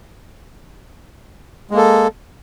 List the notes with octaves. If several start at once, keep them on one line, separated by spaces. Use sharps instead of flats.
G#3 A#3 A4